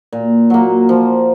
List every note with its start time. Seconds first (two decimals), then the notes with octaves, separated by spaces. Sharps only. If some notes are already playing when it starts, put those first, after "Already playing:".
0.13 A#2
0.50 F#3 A#3
0.89 F3